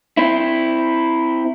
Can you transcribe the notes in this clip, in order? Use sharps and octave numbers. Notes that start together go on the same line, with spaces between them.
C4 E4